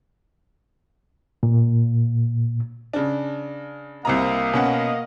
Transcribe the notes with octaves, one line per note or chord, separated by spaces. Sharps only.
A#2
C#3 D4
C2 C3 A#3 D#5 F5 A#5
B2 C#4 F#5